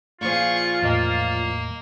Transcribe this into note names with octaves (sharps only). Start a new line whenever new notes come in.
A#2 F3 F4 G#4 C#6
E2 A2 A#3 D#5